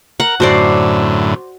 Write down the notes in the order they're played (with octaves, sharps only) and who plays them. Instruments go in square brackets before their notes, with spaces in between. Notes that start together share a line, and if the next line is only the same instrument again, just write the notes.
[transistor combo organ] A#4 [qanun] F#5
[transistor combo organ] F#2 A2 D3 [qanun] F#4 C5 D5